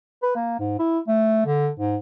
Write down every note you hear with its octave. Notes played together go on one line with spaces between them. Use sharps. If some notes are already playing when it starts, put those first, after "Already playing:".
B4
A#3
G#2
E4
A3
D3
G#2